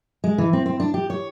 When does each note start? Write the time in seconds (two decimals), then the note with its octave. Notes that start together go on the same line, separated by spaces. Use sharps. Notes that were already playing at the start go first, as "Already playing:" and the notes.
0.24 G#3
0.38 E3
0.53 C4
0.66 C4
0.80 D4
0.94 G4
1.10 C#5